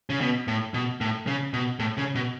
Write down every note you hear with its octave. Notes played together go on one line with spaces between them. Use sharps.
C#3
B2
A2
B2
A2
C#3
B2
A2
C#3
B2